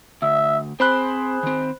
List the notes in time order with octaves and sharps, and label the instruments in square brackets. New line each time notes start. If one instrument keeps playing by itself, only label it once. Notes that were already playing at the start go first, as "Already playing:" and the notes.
[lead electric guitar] D2 [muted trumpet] E5
[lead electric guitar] C4 C6 [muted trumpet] G#4 [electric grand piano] C5 B5 F#6
[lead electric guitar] D#3 C4